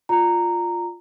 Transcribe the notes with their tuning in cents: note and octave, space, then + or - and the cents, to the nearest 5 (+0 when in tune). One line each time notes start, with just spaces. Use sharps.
F4 +0 D5 +0 A#5 -10